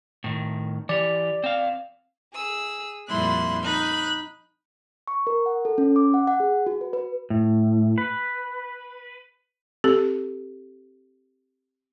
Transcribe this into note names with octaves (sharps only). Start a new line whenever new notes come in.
A2 D#3
E3 G4 D5
C4 F5
G#4 E6
F2 A#2 G3 E4 C6 F#6
D#4 B5 F#6
C#6
A#4
F#5
A4
C#4
D6
F#5
F#5
G#4
F#4
B4
B4
A2
B4
C4 G4 A4